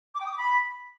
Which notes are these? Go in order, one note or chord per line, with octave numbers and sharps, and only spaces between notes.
D6
G5
D#6
D6
B5